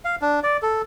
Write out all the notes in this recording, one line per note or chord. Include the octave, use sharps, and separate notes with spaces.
F5
D4
D5
A4